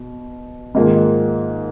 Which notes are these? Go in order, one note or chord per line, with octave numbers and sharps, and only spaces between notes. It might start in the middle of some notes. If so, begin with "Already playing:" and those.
Already playing: B2
G#2 D#3 A#3 F4 G#4